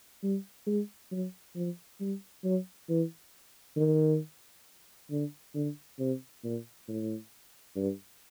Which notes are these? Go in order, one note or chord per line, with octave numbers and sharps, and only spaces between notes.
G3
G#3
F#3
F3
G3
F#3
E3
D#3
D3
D3
C3
A#2
A2
G2